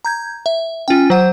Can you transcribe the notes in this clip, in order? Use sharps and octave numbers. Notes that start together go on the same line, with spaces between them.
A#5 G6 G#6
E5
C#4 F4 G5
F#3 C5 F#5